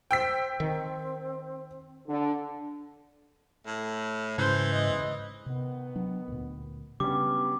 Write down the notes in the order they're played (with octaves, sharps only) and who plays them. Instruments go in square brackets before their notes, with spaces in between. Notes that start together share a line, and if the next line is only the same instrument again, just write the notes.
[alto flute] C5 [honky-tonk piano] G5 E6 B6
[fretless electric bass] D#3 [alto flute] C4
[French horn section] D3
[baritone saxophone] A2
[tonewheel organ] G#2 C#3 [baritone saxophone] E3 [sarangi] C5
[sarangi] D#5
[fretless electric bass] C3 [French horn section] D#3 B3
[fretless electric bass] F#3 D4
D2 A#2
[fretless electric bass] C#3 D4 [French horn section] F#3 B3 [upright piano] G3 C#4 [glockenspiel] D6